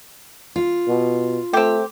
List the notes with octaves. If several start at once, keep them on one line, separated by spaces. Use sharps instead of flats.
F4
B2
A3 C4 G4